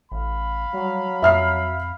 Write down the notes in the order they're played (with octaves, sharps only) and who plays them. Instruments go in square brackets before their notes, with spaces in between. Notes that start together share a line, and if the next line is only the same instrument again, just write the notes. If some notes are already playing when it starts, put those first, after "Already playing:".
[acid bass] A1 [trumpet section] F5 B5
[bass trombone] F#3 [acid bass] G3
[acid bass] F2 [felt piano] E5 F6 C7